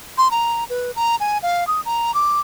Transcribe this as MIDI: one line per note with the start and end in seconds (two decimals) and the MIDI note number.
0.18 0.31 84
0.31 0.64 82
0.70 0.91 71
0.96 1.16 82
1.20 1.38 80
1.43 1.67 77
1.67 1.81 87
1.85 2.14 82
2.14 2.40 86